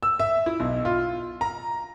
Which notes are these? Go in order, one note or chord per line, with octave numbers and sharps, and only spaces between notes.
E6
E5
E4
B1
F4
A#5